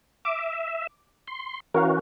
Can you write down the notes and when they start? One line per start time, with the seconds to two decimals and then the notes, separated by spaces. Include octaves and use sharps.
0.25 E5 D6
1.27 C6
1.74 E3 C#4 F#4 A#4 C#5 F5